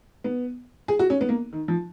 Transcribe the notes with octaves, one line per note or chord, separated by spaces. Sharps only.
B3
G#4
F#4
C#4
B3
A#3
D#3
F3